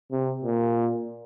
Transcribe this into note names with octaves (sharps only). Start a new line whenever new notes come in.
C3
A#2